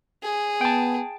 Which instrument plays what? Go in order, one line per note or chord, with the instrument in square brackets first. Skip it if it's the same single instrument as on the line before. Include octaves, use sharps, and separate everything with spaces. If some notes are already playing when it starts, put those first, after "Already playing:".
[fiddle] G#4
[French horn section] B3 [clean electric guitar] G5 A5